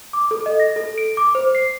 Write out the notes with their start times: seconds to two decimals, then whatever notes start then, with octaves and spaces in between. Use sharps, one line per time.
0.13 D6
0.31 A4
0.46 D#5
0.60 A#6
0.76 A4
0.98 D7
1.17 D6
1.35 C5
1.55 C7